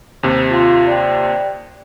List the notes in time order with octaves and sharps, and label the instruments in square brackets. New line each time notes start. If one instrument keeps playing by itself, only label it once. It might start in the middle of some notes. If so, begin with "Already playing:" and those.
[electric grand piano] D#2 C3 [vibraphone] C5
[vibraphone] F4 F5 C6
D5 G5